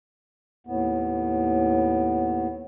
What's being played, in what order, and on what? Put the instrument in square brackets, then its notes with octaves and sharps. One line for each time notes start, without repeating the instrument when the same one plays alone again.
[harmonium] D#2 A2 B3